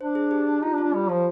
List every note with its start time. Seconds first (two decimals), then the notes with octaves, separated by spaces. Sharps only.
0.01 D4 C5
0.15 G#4
0.31 G4
0.47 G4
0.62 D#4 F4
0.73 D4
0.78 F4
0.83 D4
0.94 G3 G4
1.09 F3 F4